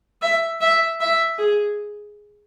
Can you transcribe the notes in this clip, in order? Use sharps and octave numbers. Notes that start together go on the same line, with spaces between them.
E5
E5
E5
G#4